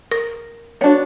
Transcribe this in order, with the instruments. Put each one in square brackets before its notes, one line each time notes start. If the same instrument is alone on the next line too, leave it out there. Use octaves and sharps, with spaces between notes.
[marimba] A#4
[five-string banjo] B3 D4 F#4 [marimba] C#5